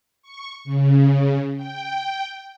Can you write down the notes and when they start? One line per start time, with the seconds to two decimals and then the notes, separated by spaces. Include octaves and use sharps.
0.22 C#6
0.64 C#3
1.56 G5